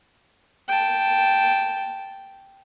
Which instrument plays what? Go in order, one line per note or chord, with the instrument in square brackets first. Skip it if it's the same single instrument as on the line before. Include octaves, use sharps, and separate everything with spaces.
[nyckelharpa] G5 A5